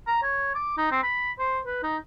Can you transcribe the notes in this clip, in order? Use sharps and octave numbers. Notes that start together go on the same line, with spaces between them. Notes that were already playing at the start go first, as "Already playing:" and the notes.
A#5
C#5
D6
D#4
C4
B5
C5
B4
D#4